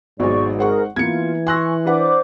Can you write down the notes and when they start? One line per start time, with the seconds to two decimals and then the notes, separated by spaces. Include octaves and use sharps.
0.20 G#1 G#2 B2 F#3 G#3 C5 D5 C#6
0.59 G#4 A#4 C5 F#5 C#6
0.96 E3 A#3 B3 F4 G#6 C#7
1.47 G#5 C6 C#6 E6 F#6 A#6
1.86 D4 B4 C5 D5 F#5 D6